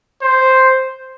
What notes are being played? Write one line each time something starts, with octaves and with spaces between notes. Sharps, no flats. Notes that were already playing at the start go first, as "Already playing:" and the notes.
C5